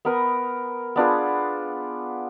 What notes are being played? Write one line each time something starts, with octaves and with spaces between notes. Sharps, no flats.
B3 A#4 D#6
B3 D4 F4 G#4